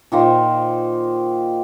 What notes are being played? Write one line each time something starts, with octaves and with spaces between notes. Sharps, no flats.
A#2 D#3 A#3 C5